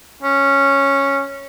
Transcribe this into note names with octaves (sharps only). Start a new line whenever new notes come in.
C#4